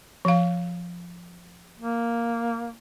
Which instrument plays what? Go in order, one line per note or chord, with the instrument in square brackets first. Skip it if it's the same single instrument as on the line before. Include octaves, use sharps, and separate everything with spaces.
[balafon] F3 F5
[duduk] A#3